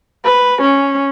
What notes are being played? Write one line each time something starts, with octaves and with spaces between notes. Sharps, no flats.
B4
C#4